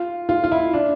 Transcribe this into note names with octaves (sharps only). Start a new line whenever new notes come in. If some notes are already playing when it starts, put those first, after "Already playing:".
Already playing: F4
F4
F4
E4
D4